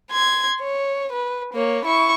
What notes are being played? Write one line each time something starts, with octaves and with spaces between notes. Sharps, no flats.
C6 G#6
C#5
B4
A#3 C#5
E4 C#6